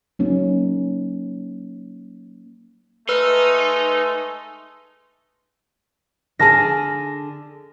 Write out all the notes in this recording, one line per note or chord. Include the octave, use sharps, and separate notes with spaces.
F#3 A#3 C#4 D#4
G#3 A3 D#4 B4 E6 F6
D3 G#4 A5 F6 A#6